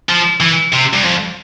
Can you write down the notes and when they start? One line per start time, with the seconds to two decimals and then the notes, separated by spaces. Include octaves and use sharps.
0.09 F3
0.40 E3
0.72 C3
0.93 G2
1.03 F2